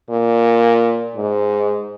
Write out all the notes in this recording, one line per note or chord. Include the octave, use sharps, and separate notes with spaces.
A#2
G#2